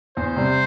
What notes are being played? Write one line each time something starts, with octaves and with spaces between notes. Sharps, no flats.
E2 C5
C3 G3